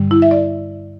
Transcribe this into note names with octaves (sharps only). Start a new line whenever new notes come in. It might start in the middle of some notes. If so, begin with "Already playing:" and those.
Already playing: G2 D3 G3
E4
E5
D5